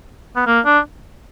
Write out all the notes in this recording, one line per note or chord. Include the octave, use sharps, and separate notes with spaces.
B3
A#3
D4